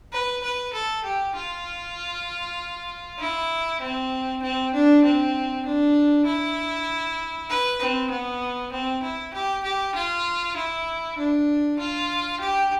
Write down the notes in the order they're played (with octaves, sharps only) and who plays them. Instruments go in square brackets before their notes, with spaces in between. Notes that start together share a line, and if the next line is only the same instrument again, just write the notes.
[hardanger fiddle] B4
B4
A4
G4
F4
E4
C4
C4
D4
C4
D4
E4
B4
C4
B3
C4
E4
G4
G4
F4
E4
D4
F4
G4